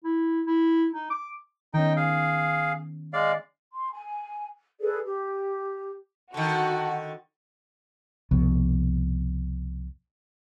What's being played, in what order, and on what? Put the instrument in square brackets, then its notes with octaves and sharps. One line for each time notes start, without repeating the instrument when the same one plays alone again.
[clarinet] E4
E4
D#4
D6
[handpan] D#3 B3 C#4 [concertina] D#4 G5
[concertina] G#4 F5
G#3 D5 F5
[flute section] C6
G#5
G#4 A4 B4 D5
G4
[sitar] D3 D#3 [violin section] F#4 [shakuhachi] A5
[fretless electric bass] C2 F2 B2